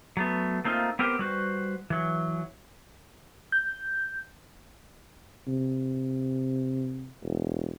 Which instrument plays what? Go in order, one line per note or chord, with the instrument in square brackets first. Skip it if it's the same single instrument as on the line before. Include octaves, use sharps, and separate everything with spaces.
[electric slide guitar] F#3 A3 B3
A3 A#3 C4 D#4 F4
B3 C4 G4 A#4
G3 F#4 B4 C5
E3 F#3
[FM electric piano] G6
[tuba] C3
E1